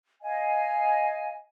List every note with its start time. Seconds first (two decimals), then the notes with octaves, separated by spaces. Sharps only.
0.22 D#5 F5 G#5